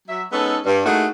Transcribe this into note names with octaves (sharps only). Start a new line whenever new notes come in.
F#3 E5
G#3 B3 C#4 D#4 A4
G2
A3 A#3 D#4 E4 F#4 G#4